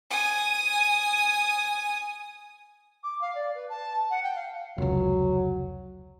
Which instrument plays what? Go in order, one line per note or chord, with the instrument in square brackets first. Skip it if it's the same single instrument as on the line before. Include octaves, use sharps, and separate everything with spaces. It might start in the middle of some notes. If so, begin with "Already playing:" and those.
[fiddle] G#5 D#6
[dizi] D6
F5
D5
B4
A5
F#5
G5
F5
[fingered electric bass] F1 C#2 [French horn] F#3